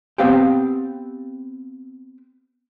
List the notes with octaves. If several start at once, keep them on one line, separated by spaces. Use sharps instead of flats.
B3 C4 G4 F5 G5